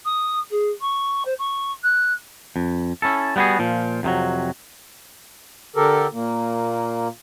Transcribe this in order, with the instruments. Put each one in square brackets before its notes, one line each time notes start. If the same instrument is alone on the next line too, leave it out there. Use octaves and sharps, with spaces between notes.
[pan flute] D#6
G#4
C#6
C5
C#6
F#6
[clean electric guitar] F2
C#4 E4 A4
G3 B3 F4 F#4 G#4
A#2 F3
F2 C3 F3 F#3
[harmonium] D3 G4 A4 A#4
A#2 A#3